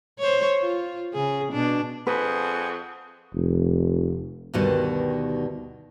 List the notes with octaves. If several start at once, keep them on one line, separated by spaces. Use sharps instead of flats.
C5 C#5
F4
C#3 G#4
B2 D4
F2 G#4 B4 F#5
F1
D2 G2 B2 D#3 G3